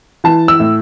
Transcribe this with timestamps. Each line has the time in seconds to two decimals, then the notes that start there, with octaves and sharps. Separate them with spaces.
0.24 E3 A5
0.48 E6
0.60 A2